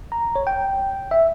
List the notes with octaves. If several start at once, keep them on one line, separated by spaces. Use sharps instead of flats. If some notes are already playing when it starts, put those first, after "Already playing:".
A#5
C#5
G5
E5